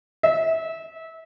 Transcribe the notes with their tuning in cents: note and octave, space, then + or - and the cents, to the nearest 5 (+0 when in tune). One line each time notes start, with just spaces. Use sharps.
E5 -25